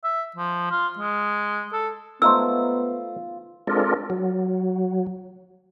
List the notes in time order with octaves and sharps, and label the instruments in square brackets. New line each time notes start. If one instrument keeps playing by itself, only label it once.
[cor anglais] E5
F3
F4
G#3
A4
[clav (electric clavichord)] A3 D#4 C5 [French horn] B3 [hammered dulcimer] F4 [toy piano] E6
[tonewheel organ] G#3 C4 D4 F4 A4 A#4
F#3